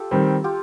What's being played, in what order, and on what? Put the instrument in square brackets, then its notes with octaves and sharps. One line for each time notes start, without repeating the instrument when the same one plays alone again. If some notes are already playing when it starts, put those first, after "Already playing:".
Already playing: [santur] F4 G4 A4
[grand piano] D#3 G3 C4
[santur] F4 G4